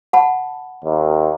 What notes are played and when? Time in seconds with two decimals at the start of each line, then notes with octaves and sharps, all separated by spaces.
0.13 F#5 A5 B5
0.85 D#2